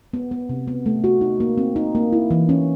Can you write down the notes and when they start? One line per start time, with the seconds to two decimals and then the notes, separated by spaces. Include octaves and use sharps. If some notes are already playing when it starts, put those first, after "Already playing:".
0.13 B3
0.31 B3
0.49 C3
0.67 B3
0.86 A3
1.04 F#4
1.21 D#4
1.40 A#3
1.58 C4
1.76 D#4
1.95 A#3
2.12 E4
2.31 E3
2.49 C#4